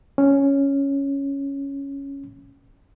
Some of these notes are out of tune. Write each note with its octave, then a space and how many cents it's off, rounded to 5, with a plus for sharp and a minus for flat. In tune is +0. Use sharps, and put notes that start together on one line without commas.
C#4 +0